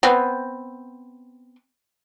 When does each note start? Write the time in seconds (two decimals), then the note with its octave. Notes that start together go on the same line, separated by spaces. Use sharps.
0.03 B3 C4